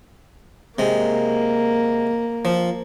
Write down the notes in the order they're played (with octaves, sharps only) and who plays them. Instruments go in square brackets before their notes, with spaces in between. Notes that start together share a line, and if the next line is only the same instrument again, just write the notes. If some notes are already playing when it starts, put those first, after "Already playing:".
[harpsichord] C3 G#3 [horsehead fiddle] A#3
[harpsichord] F3